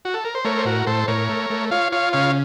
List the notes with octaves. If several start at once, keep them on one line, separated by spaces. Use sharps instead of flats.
F#4
A4
A#4
C5
A3 A#4 C#5
C5
A2 F#4 A#4
A2 A4 C5
A2 A#4 C#5
A3
A3
F4 C#5 F5
F4 C#5 F5
C#3 C#5 F5